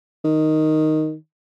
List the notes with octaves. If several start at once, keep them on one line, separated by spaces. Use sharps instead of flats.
D#3